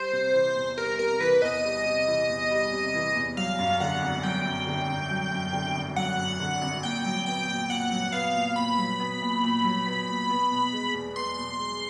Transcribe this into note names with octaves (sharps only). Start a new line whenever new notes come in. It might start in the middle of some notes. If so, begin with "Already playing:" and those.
Already playing: G3 C5
C3
E3
E2
G3 A#4
C3 A#4
E3 B4
E2 D#5
G3
C3
E3
E2
G3
C3
E3
E2
F#3 F5
F#2
D3 F#5
G#1
F#3 G5
F#2
D3
G#1
F#3
F#2
D3
G#1
F#3 F#5
F#2
D3
G#1
A#2 G5
F#3
B3 G5
A#2
A#2 F#5
F#3
B3 F5
A#2
A#2 B5
F#3
B3
A#2
A#2
F#3
B3
A#2
B3
B2
G#3
E2
B3 C6
B2
G#3